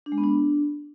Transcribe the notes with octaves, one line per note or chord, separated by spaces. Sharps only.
D4
G#3
B3
D4